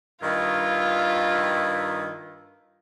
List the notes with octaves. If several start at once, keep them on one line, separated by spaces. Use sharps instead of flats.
G2 D#3 E4 F4